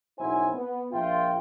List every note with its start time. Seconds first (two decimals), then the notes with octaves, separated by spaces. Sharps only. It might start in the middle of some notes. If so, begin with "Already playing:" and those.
0.19 F#1 B1 E4 C5 F#5 G#5
0.54 B3
0.92 A#1 F4 E5 G5